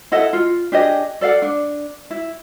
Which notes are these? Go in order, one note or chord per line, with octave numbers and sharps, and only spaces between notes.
E4 A4 D#5 F#5
F4
D4 G4 G#4 D#5
A4 D5 F5 F#5
D4
E4